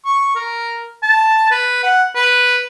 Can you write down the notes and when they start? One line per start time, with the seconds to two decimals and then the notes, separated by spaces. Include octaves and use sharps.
0.05 C#6
0.36 A#4
1.03 A5
1.51 B4
1.83 F#5
2.15 B4